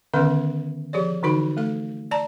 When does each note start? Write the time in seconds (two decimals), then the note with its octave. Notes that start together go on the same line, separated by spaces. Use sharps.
0.14 D3 D#3 B3 C#4 B4 E5
0.93 F3 G4 G#4 C#5 D5
1.23 D3 E3 D#4 F#4 B5
1.57 A3 A4 F5
2.11 D5 A5 A#5